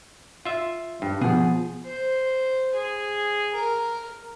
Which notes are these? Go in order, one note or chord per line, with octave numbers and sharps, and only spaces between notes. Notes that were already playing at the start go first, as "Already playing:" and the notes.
F4 E5
G2
B2 F3 G#4
C5
G#4
A#4